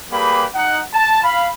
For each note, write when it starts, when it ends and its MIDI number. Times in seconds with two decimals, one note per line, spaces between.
0.12 0.44 55
0.12 0.44 58
0.12 0.44 67
0.12 0.44 68
0.12 0.44 71
0.12 0.44 83
0.55 0.80 63
0.55 0.80 78
0.94 1.22 81
1.23 1.49 77
1.23 1.49 83